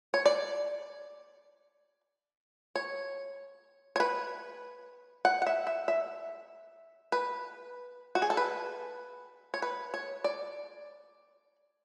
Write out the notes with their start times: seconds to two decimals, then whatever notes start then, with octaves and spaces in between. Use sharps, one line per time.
0.14 C#5
0.26 D5
2.76 C#5
3.96 C#5
4.00 B4
5.25 F#5
5.42 F#5
5.47 E5
5.67 E5
5.88 E5
7.12 B4
8.15 F#4
8.22 G#4
8.30 A4
8.37 B4
9.54 C#5
9.62 B4
9.94 C#5
10.24 D5